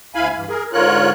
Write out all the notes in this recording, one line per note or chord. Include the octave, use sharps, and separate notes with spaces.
D2 E4 F5 G#5 B5
G2 E3
G#4 A#4
G#2 D3 F4 A#4 C#5 F#6